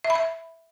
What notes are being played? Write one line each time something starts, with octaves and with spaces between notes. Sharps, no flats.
E5
B5
E5